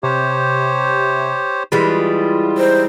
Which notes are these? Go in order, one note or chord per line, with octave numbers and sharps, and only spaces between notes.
C3 G4 C5 C#5
E3 G3 G#3 F4
D#4 C5